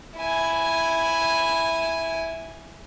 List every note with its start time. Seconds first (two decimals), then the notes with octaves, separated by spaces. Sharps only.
0.18 E4 G#5